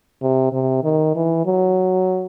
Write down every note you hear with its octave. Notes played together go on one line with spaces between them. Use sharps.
C3
C3
D#3
E3
F#3